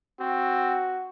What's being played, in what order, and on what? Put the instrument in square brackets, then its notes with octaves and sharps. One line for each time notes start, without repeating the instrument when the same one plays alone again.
[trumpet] C4 [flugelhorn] F#4